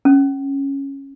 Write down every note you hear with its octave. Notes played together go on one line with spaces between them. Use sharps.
C#4